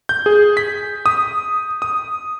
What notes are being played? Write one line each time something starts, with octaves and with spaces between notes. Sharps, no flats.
G6
G#4
B6
D#6
D#6